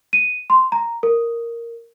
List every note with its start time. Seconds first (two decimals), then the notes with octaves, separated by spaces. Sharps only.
0.13 D#7
0.50 C6
0.72 A#5
1.03 A#4